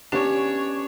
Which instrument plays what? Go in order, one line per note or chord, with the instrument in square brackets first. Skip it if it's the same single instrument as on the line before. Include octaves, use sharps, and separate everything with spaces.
[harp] B3 C#4 [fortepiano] D4 [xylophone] G4 [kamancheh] C#5